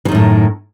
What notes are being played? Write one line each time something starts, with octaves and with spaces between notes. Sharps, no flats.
F#2 A2 D#3 E3